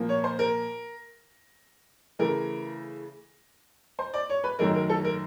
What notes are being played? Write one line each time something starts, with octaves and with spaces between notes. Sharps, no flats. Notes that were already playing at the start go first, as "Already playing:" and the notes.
Already playing: A#2 F3 A#3
C#5
C5
A#4
C#3 E3 A3 A#4
C5
D5
C#5
B4
F#2 D#3 F#3 A3 A#4
A#4
A4
A#4